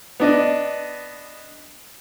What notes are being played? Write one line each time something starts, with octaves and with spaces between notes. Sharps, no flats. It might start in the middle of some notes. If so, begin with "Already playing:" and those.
B3 D4 D#5